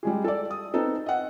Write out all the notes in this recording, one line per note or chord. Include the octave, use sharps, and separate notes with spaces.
G3 G#3 G#4
A4 D5
D#6
B3 C4 D#4 A4
D#5 F#5